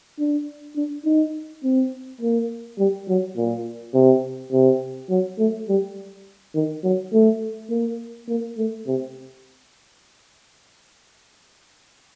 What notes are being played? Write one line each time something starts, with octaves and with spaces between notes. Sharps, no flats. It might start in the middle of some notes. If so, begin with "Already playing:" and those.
D4
D4
D#4
C4
A#3
G3
F#3
A#2
C3
C3
F#3
A3
G3
D#3
F#3
A3
A#3
A#3
A3
C3